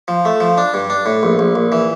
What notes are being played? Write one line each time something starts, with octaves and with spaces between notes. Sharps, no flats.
F3
A3
F3
D4
G2
D4
A2
A#1
A#1
A#1
E3